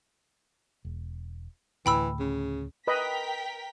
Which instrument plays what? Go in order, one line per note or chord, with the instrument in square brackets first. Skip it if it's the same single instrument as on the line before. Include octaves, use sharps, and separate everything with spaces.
[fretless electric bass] E1
[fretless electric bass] D2 A2 [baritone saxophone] E3 [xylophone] G5 B5 E6
[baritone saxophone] C#3
[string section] A#4 G5 B6 [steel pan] B4 D#5 B5